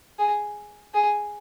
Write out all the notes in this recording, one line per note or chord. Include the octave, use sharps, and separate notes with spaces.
G#4
G#4